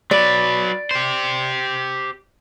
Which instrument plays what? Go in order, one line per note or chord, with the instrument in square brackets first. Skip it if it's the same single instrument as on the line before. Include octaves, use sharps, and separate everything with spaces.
[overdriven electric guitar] F#3 B4 [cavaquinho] D5
[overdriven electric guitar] G4 C5